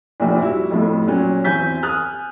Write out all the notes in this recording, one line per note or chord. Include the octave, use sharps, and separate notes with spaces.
F1 A#1 A#2
G3 E4 F#4
F2 A2
A#2 F#3 C#4
E2 C4 G#5 G6 B6
G#5 D#6 F6 F#6